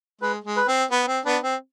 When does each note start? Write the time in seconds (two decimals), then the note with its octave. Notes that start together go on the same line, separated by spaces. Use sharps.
0.21 G#3 B4
0.44 G#3
0.57 B4
0.68 C4
0.91 B3 B4
1.08 C4
1.26 B3 D4 B4
1.43 C4